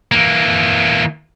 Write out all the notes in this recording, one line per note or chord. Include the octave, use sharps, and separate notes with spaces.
E3 A#3